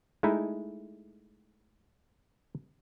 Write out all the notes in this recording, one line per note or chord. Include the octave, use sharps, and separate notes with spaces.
G#3 A3 D#4 E4